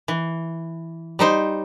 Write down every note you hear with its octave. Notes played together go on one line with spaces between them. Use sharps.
E3
G3 D#4 C5